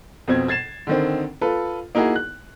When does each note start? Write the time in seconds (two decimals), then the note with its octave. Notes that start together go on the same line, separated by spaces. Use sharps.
0.28 F2 B2 C4 G#6
0.48 G#6 A6 C7 E7
0.87 D3 D#3 C4
1.41 F4 A4 B4
1.95 A#3 D#4 E4 F#4 G#4
2.16 F#6